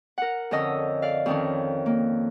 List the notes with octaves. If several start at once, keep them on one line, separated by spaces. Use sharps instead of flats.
A#4 F#5
F2 D3 C#4 D#5 E6
D5 F5
F2 D#3 C#4
A#3